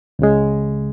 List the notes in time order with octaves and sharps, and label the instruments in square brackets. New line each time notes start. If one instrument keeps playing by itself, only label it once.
[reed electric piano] C#2 C#3 G#3